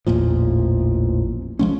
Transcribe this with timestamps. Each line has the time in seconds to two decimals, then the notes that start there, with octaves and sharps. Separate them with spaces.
0.07 A1 E2 A#2 F3
1.59 F3 G#3 C#4